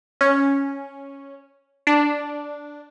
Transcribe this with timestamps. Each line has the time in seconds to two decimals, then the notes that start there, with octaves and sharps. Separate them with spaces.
0.21 C#4
1.87 D4